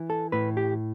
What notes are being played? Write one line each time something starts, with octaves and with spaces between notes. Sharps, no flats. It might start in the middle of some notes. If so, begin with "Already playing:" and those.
Already playing: E3
A4
A2 B4
G4